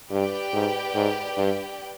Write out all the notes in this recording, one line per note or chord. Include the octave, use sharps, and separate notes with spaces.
G2 G4 B4 D5 G5
G#2
G#2
G2